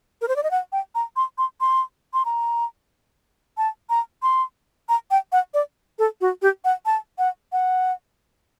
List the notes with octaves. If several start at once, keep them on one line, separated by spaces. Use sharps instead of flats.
A#4
C5
D5
D#5
F#5
G5
A#5
C6
C6
C6
C6
A#5
A5
A#5
C6
A#5
G5
F#5
D5
A4
F#4
G4
F#5
A5
F#5
F#5